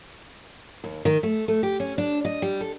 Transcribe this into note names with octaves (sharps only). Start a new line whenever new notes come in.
D#2
D#3
A3
A3
G4
C#4
D4
D#5
G3
A4